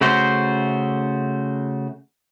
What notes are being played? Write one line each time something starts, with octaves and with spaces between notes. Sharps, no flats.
C#3 A3 F#4 C5